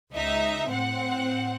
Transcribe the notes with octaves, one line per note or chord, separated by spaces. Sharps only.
C#2 D#4 E5
A2 C4 F#5